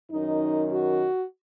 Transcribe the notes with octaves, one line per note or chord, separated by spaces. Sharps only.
F#2 D#3 D#4
F#4